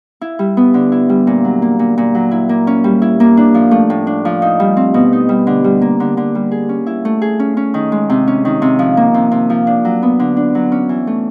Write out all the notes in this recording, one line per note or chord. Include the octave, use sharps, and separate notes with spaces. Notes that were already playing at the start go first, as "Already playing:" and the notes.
E4
G3
B3
D3
E4
G3
A#2
F#3
A#3
A#2
A#2
F#3
E4
A#3
C#4
G3
E4
A#3
D4
F3
A3
A2
D4
F3
D#4
G3
C4
B2
D#4
G3
D3
G3
A#3
D3
D3
G3
G#4
C#4
E4
A3
G#4
C#4
C#4
D#3
G#3
C3
C#4
D#3
C3
F3
A#3
C3
C3
F3
D4
F#3
B3
D3
D4
F#3
C#4
E3
A3